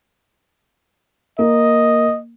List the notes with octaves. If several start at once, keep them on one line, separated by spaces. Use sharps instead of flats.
A#3 D#5